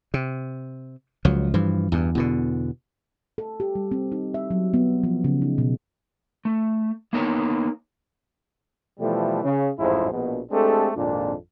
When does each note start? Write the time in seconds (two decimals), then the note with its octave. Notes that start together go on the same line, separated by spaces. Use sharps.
0.14 C3
1.25 C#2 F3 F#3
1.54 G2 E3 F3
1.92 E2 G2
2.15 E2 B2 D3
3.38 A4
3.60 G4
3.75 G3
3.91 C4
4.12 D#4
4.34 E5
4.51 F#3
4.74 B3
5.03 F3
5.24 C#3
5.42 D#4
5.58 B2
6.45 A3
7.13 A#3 B3 D#4 A#4 C#5
9.00 B2 E3 F3 G3 A3
9.44 C#3
9.79 A1 F2 G#2 E4 G#4 C5
10.12 A#1 B2
10.51 G#3 A3 C4 D4 G4 A4
10.96 G#1 F2 A#2 D4